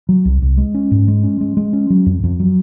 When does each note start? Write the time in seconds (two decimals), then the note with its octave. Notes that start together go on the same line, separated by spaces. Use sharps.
0.09 F#3
0.25 C2
0.42 C2
0.57 G#3
0.75 C#4
0.91 G#2
1.08 G#3
1.24 C#4
1.41 G#3
1.57 G#3
1.73 C#4
1.90 F#3
2.06 F2
2.23 F2
2.40 F#3